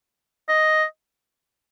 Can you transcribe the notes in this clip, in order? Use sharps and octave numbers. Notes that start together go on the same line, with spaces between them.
D#5